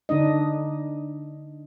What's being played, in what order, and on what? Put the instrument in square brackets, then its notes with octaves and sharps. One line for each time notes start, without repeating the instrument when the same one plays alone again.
[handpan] D3 D4 D#4 D#5